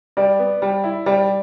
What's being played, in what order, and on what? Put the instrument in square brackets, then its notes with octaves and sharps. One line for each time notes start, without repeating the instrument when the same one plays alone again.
[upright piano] G3 [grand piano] D5
[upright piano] B3
G3
E4
[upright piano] G3 [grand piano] D5